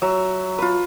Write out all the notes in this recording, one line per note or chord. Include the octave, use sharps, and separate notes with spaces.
F#3 E5
F4 B4